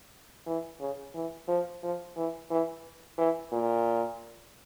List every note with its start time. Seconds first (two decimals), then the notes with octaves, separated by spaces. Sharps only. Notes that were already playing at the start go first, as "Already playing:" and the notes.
0.47 E3
0.80 C#3
1.15 E3
1.48 F3
1.83 F3
2.16 E3
2.50 E3
3.18 E3
3.52 A#2